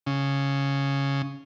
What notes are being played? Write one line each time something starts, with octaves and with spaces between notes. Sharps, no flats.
C#3